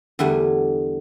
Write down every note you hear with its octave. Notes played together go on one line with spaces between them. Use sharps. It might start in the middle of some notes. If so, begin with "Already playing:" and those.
E2 D3 G3 A3 F#5 G#5